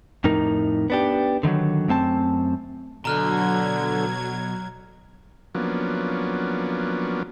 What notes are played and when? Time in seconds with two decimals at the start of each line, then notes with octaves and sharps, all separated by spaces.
0.24 F2 A2 D#4 A#4
0.90 B3 D4 G4
1.43 D3 D#3 F3 F#3
1.88 F#2 A3 C4 A5
3.05 B2 D3 F#3 A#5 F6 F#6 G#6
5.55 F3 F#3 A#3 B3 C#4 D4